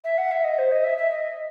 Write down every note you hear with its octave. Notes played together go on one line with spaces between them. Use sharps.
E5
F#5
E5
D#5
C5
D#5
E5
E5
D#5